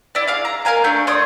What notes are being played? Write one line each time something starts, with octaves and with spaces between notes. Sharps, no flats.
E4 D5
G#4 F5 D6
A#5
A#4 F5 G#5 A#5
A3 D4 G#5 G6
C#5 D5 C6 D#6